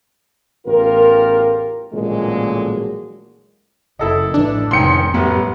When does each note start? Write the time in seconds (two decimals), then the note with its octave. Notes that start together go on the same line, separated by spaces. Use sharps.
0.66 A1 E2 F4 G4 A#4
1.92 A1 A#2 D3 F3 F#3 G#3
3.99 F#1 E4 A4 D#5
4.34 A1 E3 D4
4.71 F1 C#2 C3 D#3 G5 C6 C#7
5.14 A1 F#2 G3 B3